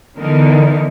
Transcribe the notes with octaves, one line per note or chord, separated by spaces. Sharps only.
D3 E3 B3 D#4 A#4